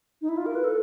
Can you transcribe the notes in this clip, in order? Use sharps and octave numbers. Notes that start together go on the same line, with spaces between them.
D#4
E4
F4
A#4
B4
A4